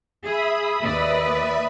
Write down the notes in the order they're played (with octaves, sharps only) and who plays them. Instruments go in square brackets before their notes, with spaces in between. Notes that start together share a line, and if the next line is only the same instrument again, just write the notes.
[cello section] G#4 [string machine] E5 B5 D#6
[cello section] D#2 B4 D5